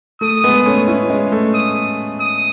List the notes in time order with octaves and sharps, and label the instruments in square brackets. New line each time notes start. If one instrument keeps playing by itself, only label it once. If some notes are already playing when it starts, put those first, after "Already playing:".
[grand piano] A3 [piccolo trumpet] D#6
[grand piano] G#3 B3
A3 C#4
C#4 E4
G#3
A3
[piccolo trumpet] D#6
D#6